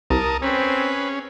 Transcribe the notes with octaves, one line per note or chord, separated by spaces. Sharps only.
C2 A#4 A5 D#6
C4 C#4 G#4 B4 B5